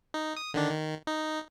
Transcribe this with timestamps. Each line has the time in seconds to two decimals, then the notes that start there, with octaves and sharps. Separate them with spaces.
0.14 D#4
0.37 D#6
0.54 D3 D#3 D4
0.71 D#3
1.07 D#4